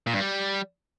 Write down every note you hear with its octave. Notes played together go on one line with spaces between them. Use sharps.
A#2
G2
G3